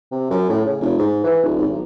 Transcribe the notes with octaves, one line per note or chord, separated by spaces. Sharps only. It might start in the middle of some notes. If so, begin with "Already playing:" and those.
C3
F#2
A2
C#3
F1
G#2
E3
D#1
G#1
B1